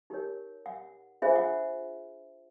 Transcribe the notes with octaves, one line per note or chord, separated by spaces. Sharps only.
D#4 G4 A#4 C#5
F#5
D4 F4 G#4 C5 E5
F#5